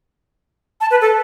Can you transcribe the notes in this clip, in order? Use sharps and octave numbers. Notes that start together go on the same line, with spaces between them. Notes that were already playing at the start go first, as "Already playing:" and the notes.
A5
B4
A4